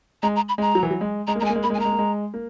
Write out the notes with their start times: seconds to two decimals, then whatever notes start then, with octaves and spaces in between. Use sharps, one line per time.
0.23 G#3 A#5
0.36 A#5
0.49 B5
0.58 G#3 A#5
0.75 F#3
0.83 E3
0.91 F#3
1.01 G#3
1.27 G#3 A#5
1.35 A#3
1.40 G#3 A#5
1.45 G#5
1.50 A#3
1.55 G#3
1.63 A#3 B5
1.70 G#3
1.74 G#5
1.78 A#3 A#5
1.85 G#3
1.92 A#3
1.99 G#3
2.34 A#3